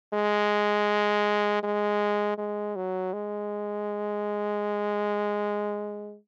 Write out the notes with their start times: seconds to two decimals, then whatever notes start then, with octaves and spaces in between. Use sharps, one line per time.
0.13 G#3
1.63 G#3
2.38 G#3
2.76 F#3
3.13 G#3